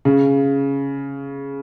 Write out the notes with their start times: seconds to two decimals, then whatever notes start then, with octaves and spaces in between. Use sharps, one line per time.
0.05 C#3